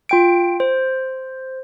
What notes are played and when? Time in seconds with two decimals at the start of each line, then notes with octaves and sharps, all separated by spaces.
0.09 F4 G5 D7
0.60 C5